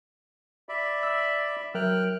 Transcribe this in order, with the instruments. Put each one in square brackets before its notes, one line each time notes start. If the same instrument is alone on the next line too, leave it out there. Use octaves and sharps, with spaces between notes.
[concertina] D5 E5 B5
[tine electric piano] E6
[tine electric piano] F#3 A#4 E5 [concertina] G5 F6 F#6